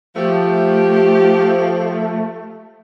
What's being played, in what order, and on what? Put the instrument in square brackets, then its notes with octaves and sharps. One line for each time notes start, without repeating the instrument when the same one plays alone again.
[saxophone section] F3 [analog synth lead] A3 [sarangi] G4